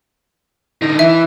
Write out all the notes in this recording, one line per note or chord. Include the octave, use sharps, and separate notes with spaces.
D3 D#4
E3 E5